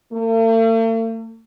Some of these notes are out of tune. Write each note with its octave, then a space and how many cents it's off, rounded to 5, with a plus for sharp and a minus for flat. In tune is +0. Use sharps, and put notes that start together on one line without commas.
A3 +45